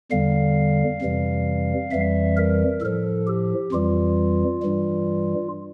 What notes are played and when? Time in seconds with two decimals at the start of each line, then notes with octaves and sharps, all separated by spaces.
0.11 E2 D3 G3 F5
1.01 F2 C3 E3 G3
1.91 F2 E3 G3 E5
2.37 A#4
2.81 A2 F3 A4
3.27 G4
3.72 F2 E3 G3 F4
4.62 G2 E3 G3